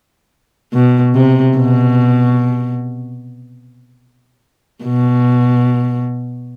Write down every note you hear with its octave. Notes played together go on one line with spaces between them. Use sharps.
B2
C3
B2
B2